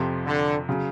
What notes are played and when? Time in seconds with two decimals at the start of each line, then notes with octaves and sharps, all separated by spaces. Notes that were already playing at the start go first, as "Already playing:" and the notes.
Already playing: F2 C3 F3
0.26 D3
0.69 C#3 F#3